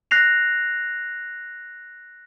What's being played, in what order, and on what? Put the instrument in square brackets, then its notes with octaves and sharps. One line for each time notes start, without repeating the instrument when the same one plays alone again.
[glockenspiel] F#6 A#6 C7 F7